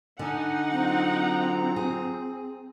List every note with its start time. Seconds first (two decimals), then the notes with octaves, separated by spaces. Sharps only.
0.19 D3 D#4 F#5 G#5
0.71 F#3 C4 F4 A#5
1.76 G#4